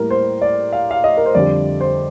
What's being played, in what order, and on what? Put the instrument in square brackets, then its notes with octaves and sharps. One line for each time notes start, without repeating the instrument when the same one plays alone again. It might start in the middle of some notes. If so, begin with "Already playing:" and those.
Already playing: [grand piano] A2 G3 A#3 A#4
C5
D5
F5
F5
D#5
A#4
C5
F2 D3 G3 D5
C5